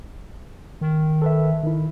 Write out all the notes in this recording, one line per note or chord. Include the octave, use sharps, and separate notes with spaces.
D#3
A4 B4 E5
D#3 E4